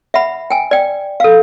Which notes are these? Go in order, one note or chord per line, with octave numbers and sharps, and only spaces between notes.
E5 F#5 B5
G5 G#5
D5 G5
A4 F5